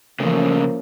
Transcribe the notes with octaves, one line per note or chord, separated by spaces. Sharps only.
C#3 E3 F3 A3 A#3 C#4